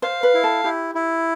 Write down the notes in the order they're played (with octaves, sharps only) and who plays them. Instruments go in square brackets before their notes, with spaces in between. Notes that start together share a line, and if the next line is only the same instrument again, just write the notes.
[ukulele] C5 [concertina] F5
[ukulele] B4
[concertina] E4
[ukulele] A4
[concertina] E4 [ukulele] G4
[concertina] E4